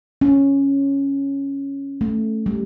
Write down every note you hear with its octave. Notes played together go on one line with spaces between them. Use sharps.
C#4
A3
G3